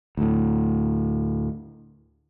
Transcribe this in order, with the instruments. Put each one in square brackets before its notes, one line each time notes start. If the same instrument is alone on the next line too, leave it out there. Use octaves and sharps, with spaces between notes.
[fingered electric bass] D2 A2